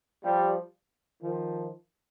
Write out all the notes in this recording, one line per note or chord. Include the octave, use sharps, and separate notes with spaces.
F3 G3
D#3 F3